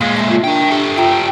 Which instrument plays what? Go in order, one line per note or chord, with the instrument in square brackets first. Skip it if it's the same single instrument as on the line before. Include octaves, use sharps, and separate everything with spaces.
[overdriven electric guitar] A#2 G#3 [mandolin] F4
[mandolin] E5 A5 C6
[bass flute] F4
[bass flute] D4 [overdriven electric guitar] A#4 G5
[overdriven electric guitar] G4 A4 [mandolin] C#6
[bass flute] F4 [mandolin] E5 G5 A#5